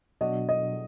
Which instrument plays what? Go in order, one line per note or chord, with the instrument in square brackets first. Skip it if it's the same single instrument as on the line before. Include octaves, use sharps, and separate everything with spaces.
[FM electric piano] B2 F#3 D4 F#4 [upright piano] D#5
[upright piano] D#5